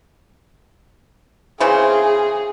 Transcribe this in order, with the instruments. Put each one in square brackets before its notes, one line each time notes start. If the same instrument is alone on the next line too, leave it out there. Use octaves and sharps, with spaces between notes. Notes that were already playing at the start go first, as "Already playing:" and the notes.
[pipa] C#3 E3 C4 [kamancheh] G#4